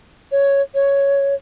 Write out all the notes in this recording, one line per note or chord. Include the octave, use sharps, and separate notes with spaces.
C#5
C#5